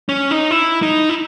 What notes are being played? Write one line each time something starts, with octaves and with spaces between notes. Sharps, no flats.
C#4
D#4
E4
D#4
E4